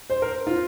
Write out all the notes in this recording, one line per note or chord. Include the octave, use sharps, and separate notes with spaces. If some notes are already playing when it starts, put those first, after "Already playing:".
C5
A#4
F4